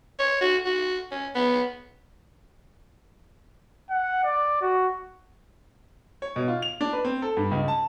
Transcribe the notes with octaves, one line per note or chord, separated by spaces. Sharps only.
C#5
F#4
F#4
C#4
B3
F#5
D5
F#4
C#5
B2
F4
F7
D4
B4
C4
A4
G2
C#2
A5